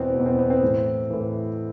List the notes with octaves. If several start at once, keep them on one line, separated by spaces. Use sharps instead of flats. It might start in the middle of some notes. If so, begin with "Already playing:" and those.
Already playing: E2 B2 B3 C4
B2
E2
C4
B3
C4
A2 E3
A2 E3